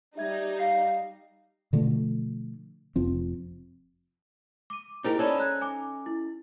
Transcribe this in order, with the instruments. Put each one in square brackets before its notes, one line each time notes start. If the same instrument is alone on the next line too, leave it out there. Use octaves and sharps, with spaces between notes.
[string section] G3 D#4 [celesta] E5 G#6
[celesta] F5 C7
[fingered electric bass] B2 D3 F3 A3
F1 F3 C4
[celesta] D6 D#7
[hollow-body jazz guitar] D#4 G4 A#4 [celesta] E4 G#4 C5
[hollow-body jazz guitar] C#4 D#4 A4 [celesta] C5 D5 B5
[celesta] A#5 F#6 G#6
G#5 D6
E4